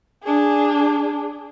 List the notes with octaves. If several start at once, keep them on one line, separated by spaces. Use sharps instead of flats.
D4 G#4